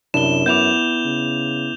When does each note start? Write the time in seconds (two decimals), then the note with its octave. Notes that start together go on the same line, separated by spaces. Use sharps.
0.14 F#2 C3 D4 E4 E7 G7
0.46 B3 E4 D6 G6 E7 F7
1.05 C#3